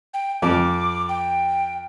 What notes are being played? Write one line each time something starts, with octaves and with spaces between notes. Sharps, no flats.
G5
F2 D6
G5